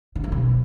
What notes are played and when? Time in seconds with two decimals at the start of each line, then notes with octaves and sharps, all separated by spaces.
0.15 D3
0.24 F#2
0.32 B2